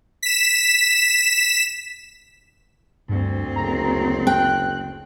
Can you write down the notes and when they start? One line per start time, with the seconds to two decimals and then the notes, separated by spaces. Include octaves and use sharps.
0.23 B6 E7
3.09 D2 G2 C4
3.56 F#1 A#5
4.27 G5 F#6